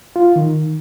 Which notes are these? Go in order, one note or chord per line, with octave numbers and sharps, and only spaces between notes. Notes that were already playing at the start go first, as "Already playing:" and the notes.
F4
D#3